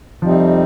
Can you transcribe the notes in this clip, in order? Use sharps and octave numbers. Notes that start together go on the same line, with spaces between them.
F2 C3 F3 G3 C4 D#4